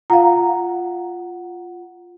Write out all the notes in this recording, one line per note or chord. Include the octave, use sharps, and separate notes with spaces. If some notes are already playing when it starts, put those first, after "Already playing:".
F4 F5 F#5 A#5